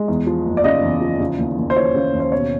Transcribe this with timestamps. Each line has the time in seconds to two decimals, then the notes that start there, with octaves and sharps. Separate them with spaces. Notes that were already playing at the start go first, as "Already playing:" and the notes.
Already playing: G#3
0.08 E2
0.27 F3
0.46 F#1
0.57 D5
0.64 C#3 D#5
0.83 E2
1.01 F3
1.20 C#3
1.39 D#2
1.58 D#2
1.70 C5
1.76 F3 C#5
1.95 C#3
2.13 D#2
2.20 C5
2.32 B2 C#5